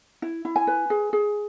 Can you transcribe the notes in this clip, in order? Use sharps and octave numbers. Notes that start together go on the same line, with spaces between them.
E4
E4
G#5
B4
G#4
G#4